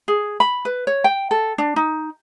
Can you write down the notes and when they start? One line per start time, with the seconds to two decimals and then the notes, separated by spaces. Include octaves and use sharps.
0.08 G#4
0.40 B5
0.65 B4
0.87 C#5
1.04 G5
1.31 A4
1.58 D4
1.76 D#4